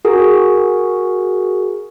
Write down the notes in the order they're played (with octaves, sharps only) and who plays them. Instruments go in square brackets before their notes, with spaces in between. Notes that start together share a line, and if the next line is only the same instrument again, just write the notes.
[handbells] F#4 G#4 A#4